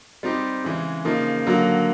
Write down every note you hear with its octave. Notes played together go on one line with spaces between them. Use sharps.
G3 C4 D#4 G4
C#3 E3 G#3
C#3 F3 A#3 D#4
D3 F#3 A#3